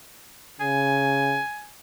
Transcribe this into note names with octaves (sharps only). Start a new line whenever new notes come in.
C#3 G#5